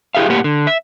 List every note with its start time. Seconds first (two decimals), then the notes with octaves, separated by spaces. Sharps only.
0.15 E4 G4 G#4 E5 F5
0.29 A2 A#3 G4 F#5
0.44 D3
0.67 E5